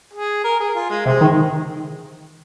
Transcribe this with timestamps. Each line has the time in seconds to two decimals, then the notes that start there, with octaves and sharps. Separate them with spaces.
0.14 G#4
0.44 A#4
0.60 G#4
0.75 F4
0.90 G#3
1.06 C3 G#3
1.21 D#3